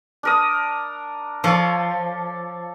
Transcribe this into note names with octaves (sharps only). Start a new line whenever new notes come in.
D4 A#4 D#6
F3 A4 C#5 D5